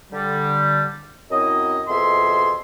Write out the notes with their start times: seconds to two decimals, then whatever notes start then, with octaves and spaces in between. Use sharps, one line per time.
0.12 D3 G3
1.31 F#2 F#3 C4 E4 D#5
1.88 F2 B2 G#4 E5 C6